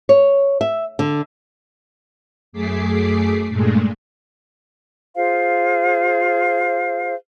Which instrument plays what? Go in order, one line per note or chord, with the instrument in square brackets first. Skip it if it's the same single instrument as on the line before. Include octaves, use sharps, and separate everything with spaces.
[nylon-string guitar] C#5
E5
D3
[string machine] F#2 A3 G#4 D6 B6 C7
G2 A#2 G#3 A3
[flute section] F4 G#4 C5 F5